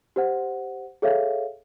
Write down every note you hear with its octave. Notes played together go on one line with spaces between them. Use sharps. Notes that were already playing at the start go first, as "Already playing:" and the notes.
G4 C5 F#5
G#4 A4 C#5 E5 F5